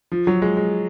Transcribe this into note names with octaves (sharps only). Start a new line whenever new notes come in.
F3
F#3
G#3
G#3